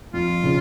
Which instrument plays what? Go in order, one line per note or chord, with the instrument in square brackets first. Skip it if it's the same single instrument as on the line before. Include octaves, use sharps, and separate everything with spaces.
[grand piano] F2 [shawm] F4
[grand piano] C#3 F3